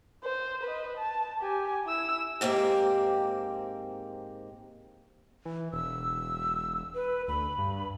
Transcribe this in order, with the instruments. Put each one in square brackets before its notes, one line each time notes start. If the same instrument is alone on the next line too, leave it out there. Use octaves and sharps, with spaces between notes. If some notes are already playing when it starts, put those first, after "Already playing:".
[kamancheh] C5
B4 D#5
A5
G4 G#5
E4 E6
[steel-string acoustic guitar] G#2 A#3 C4 G4
[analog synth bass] E3
[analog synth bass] E1 [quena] E6
[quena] B4
[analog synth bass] D2 [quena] B5
[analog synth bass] G2